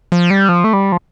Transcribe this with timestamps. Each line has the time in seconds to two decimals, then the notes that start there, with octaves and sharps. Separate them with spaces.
0.12 F3
0.30 G3
0.49 F3
0.64 A3
0.73 G3
0.92 F3